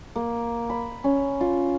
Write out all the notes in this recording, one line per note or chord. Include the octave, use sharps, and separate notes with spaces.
A#3
B5
C#4
F4